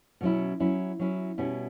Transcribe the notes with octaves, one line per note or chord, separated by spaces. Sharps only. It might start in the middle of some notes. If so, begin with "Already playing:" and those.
B2 F#3 C#4 E4
F#3 C#4 E4
F#3 C#4 E4
B2 G3 C#4 E4